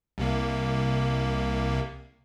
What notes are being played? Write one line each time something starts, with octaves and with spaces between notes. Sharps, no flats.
C2 C3 A#3